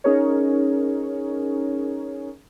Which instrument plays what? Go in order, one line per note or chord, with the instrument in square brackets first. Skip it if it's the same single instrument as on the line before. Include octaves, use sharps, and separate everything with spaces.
[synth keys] C#4 D#4 G#4 A#4 C#5